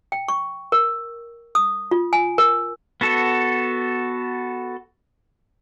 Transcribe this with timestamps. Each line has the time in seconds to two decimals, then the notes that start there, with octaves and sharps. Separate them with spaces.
0.12 G5
0.28 C#6
0.72 A#4
1.55 D#6
1.91 F4
2.13 G#5
2.38 A#4
3.01 B3 F#4 A4